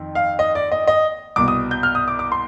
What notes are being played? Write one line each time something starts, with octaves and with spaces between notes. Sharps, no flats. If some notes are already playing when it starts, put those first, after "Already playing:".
Already playing: F2 D#3
F5
D#5
D5
D#5
D#5
C2 B2 D6
D#6
G6
F6
D#6
D6
D6
C6